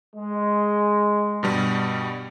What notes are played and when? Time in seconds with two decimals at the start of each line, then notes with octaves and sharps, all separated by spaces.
0.15 G#3
1.43 G2 B2 G3